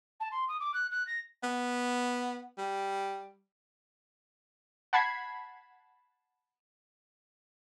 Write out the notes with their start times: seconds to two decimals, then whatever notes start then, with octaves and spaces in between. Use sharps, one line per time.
0.20 A5
0.31 C6
0.48 D#6
0.60 D6
0.74 F#6
0.91 F#6
1.07 A#6
1.43 B3
2.58 G3
4.93 F#5 A5 B5 G#6 B6 C7